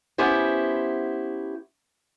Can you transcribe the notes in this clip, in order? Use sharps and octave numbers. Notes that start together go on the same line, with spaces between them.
B3 C#4 E4 G4 C5